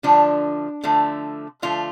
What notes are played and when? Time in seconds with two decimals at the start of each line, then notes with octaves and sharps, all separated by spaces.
0.03 D3 F3 A3 D4
0.83 D3 F3 A3
1.62 D3 F3 A3 F4